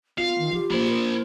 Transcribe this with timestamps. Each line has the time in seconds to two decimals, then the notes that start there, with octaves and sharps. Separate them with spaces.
0.18 B3 F4 F5
0.38 D#3
0.53 F3 G4
0.71 F3 A#3 F4 C5 B5
0.88 A#4